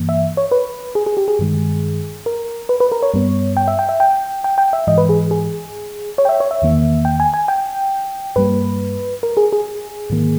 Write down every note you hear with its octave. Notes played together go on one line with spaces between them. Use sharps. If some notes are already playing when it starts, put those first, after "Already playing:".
Already playing: G2 E3 A#3
E5
C#5
B4
G#4
G#4
G4
G#4
G2 D#3 G#3
A#4
B4
B4
A#4
C#5
G2 G3 B3
G5
E5
G5
E5
G5
G5
G5
E5
G#2 E3 G#3 D#5
B4
G#4
G#4
C#5
G5
E5
C#5
E5
E2 D#3 A#3
G5
G#5
G#5
G5
G2 G3 A#3 B4
A#4
G#4
G#4
G#2 D#3 A#3